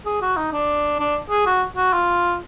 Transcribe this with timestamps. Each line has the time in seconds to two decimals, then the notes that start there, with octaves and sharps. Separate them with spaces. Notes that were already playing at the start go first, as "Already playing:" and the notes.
0.05 G#4
0.22 F#4
0.37 D#4
0.52 D4
0.99 D4
1.30 G#4
1.46 F#4
1.76 F#4
1.93 F4